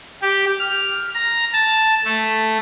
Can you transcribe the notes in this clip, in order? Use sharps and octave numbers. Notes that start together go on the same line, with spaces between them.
G4
F6
A#5
A5
A3